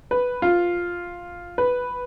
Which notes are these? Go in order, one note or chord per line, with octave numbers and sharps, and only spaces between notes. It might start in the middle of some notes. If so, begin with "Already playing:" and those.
B4
F4
B4